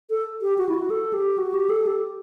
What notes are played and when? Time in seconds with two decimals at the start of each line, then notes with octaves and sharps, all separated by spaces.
0.10 A4
0.42 G4
0.58 F#4
0.69 E4
0.74 F#4
0.90 A4
1.13 G4
1.38 F#4
1.54 G4
1.70 A4
1.87 G4